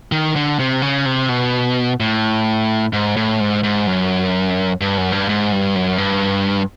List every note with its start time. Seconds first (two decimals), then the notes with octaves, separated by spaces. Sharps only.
0.12 D#3
0.36 D3
0.59 C3
0.82 C#3
1.05 C3
1.29 B2
2.00 A2
2.93 G#2
3.16 A2
3.40 G#2
3.64 G#2
3.87 F#2
4.81 G2
4.98 F#2
5.12 G2
5.29 G#2
5.52 G2
5.76 F#2
5.98 G2